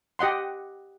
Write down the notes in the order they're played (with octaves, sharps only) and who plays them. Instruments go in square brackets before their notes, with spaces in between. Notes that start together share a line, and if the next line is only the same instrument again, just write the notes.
[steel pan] G4 D#5 F#5 C6